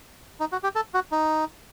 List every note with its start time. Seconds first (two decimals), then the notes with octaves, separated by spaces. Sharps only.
0.40 D#4
0.52 F#4
0.63 G4
0.75 A4
0.94 F#4
1.12 D#4